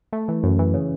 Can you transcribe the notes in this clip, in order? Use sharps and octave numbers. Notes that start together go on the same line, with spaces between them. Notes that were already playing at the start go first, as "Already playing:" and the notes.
A3
E3
F#2
E3
C#3